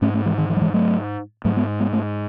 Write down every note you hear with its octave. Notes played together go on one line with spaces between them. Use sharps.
G#2 A3 C#4
A3 C#4
E3 G#3
D#3
E3
F#3
E3 G#3
F#3 A3
G#2 F#3 A3
G#3 B3
G#3 B3
A3 C#4